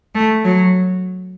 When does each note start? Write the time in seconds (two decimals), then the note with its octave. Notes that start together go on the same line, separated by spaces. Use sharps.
0.15 A3
0.44 F#3